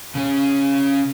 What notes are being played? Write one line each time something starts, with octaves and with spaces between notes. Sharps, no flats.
C#3 C#4